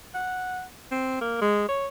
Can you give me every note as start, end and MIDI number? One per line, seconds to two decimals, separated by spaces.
0.14 0.63 78
0.92 1.20 60
1.21 1.40 58
1.41 1.67 56
1.69 1.88 73